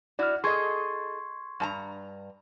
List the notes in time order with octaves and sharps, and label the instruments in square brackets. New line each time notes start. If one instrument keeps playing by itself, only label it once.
[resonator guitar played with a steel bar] E4 F#4 [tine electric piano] D5 F6
[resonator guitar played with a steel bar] G#4 A4 D#5 [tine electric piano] C6 C#6 G#6
[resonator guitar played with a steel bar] G2 A5 A#5